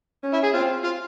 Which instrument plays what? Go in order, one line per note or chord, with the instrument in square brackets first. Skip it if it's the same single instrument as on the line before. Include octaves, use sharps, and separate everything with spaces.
[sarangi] C#4
[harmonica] E4
G#4
[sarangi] C4 [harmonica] F4
[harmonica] F4